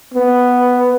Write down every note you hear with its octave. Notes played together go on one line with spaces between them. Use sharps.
B3